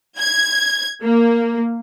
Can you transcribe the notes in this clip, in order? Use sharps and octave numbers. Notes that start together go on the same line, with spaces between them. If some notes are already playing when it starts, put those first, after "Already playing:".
G#6
A#3